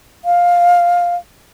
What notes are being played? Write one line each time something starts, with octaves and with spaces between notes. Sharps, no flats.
F5